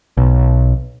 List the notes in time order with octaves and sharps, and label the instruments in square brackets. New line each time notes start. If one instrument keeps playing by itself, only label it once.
[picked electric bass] B1